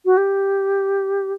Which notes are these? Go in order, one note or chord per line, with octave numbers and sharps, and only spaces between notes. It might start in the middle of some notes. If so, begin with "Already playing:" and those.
F#4
G4